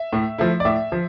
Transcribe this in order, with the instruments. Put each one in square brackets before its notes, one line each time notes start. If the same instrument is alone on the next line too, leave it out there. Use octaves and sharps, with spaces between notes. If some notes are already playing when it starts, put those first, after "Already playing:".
Already playing: [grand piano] E5
A2
F3 A3 E4
D5
A2 E5
F3